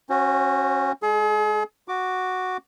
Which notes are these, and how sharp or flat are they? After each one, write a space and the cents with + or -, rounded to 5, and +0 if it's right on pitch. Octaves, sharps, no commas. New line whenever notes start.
C#4 -20 F#4 +0 C5 +25
G#3 -10 G#4 +40
F#4 +0 D6 +0